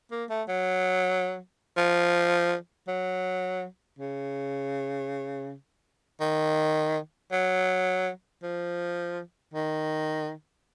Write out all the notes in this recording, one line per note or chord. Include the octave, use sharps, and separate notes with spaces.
A#3
A3
F#3
F3
F#3
C#3
D#3
F#3
F3
D#3